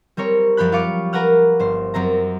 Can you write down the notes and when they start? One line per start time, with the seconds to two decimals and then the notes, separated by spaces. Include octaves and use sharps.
0.17 G3 C4 A#4 C#5
0.57 F#2 F3 G4 B5 F#6
0.72 F4 F5 C#6 D6
1.13 A#4 B4 F#5 F6
1.59 G1 C5
1.94 F#2 F#3 C4 A#5